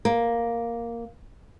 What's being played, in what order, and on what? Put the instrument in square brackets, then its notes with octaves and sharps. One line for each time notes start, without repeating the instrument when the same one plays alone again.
[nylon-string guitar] A#3